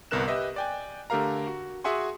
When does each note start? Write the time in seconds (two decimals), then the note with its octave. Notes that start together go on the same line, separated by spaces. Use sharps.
0.11 G1 C2 B3 A#4 F#6 E7
0.28 G4 B4 D#5 E5
0.56 D5 G5 G#5
1.10 D3 A3 G4 A#4 F5 A#5
1.47 F#4
1.84 F#4 G#4 E5 F#5 G#5 C6